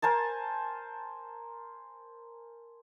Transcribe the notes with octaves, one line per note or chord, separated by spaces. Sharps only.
A#4 C5 G#5 A5